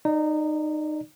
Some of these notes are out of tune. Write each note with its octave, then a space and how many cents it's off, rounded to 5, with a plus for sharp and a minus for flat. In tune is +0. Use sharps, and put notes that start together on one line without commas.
D#4 -20 D5 +0